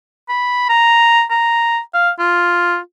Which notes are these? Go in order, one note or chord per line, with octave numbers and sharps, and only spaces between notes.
B5
A#5
A#5
F5
F4